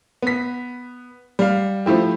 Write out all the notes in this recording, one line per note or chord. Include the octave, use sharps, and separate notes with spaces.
B3 B6
G3 F5
F3 A3 E4 G4